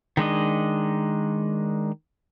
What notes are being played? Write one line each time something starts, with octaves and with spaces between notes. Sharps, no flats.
D#3 G#3 D4 D#5